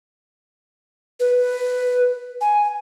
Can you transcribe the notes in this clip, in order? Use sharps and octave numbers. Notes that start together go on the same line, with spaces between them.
B4
G#5